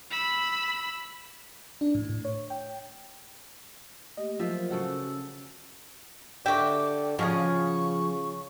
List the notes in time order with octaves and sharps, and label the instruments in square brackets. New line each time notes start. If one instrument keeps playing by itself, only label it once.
[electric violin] B5 E6
[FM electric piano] D4
A2
A2
C#5
G5
[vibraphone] A3 A#3 G4 [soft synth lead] D#5
[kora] F3 E5 [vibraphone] F#3 A#4 C5 [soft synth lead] F4
[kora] C#3 A4 F#5 [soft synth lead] F#4
[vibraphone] E6
[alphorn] D3 [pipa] F#4 G4 [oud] E5 [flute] D6
[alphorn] C#3 [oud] F3 [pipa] F#3 C#4 G#4 [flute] C#6